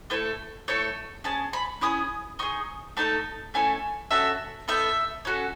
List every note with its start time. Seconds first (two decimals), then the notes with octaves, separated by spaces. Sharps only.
0.10 A3 E4 A4 B4
0.68 A3 E4 A4 C#5
1.24 C#4 G#4 A5
1.53 B5
1.81 C#4 E4 G#4 D#6
2.39 D#4 G#4 C#6
2.97 A3 D#4 A4 A5
3.54 A3 C#4 E4 A4 G#5
4.11 C#4 F#4 A4 E5
4.68 B3 D#4 A4 E5
5.25 C#4 F#4 A4